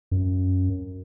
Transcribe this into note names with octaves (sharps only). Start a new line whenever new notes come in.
F#2